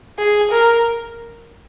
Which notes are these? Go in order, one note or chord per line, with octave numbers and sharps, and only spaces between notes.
G#4
A#4